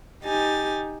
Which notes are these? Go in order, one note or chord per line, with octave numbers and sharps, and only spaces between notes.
D#4 G4 G#5 A6